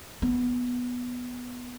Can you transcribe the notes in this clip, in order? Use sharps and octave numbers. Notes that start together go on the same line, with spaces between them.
B3